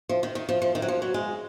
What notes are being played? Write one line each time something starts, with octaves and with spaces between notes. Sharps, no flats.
F3
D#3
D#3
F3
F3
D#3
F#3
F3
F#3
G#3